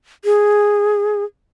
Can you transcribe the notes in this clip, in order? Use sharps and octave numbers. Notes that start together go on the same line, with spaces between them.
G#4